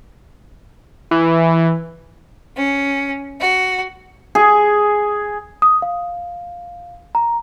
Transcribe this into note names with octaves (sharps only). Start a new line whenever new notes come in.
E3
C#4
F#4
G#4
D#6
F5
A#5